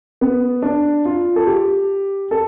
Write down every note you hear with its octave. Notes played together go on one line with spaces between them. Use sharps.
B3
D4
F4
A4
G4
A4